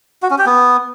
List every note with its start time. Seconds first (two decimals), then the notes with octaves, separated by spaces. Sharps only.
0.22 F#4
0.30 C#4
0.38 G4
0.46 B3